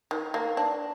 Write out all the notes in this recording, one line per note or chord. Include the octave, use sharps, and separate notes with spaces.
D#3
A#3
D4